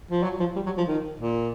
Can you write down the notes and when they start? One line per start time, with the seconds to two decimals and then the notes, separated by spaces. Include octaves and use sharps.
0.11 F3
0.24 F#3
0.40 F3
0.56 G3
0.66 F#3
0.77 F3
0.88 D#3
1.20 A#2